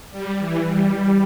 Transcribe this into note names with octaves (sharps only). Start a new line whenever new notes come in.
G3
E3
G3